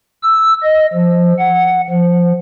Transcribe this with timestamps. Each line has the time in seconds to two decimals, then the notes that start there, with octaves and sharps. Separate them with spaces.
0.23 E6
0.63 D#5
0.94 F3
1.38 F#5
1.90 F3